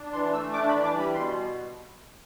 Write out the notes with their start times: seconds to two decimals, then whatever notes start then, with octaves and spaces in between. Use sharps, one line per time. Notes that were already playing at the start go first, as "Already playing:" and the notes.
Already playing: D4
0.13 E3 C6
0.33 A3 E6
0.53 D4 D6
0.69 B5
0.74 E3
0.84 D6
0.94 G3
0.99 B5
1.14 B2 C6